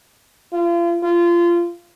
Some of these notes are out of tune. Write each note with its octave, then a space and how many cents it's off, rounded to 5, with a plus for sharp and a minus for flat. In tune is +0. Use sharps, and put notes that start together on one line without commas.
F4 -35
F4 -25